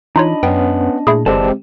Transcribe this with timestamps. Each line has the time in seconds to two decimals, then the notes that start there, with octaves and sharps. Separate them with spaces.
0.16 E3 D4 D#4 F4 C#5 D#5 B5
0.43 F#2 B3 C#4 G5
1.07 A#2 A3 E4 G#4
1.26 F#1 D3 E3 G#3 C4 G4 D5 A5